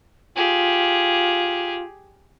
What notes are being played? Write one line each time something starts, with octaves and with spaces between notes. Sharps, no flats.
F4 G4 G#4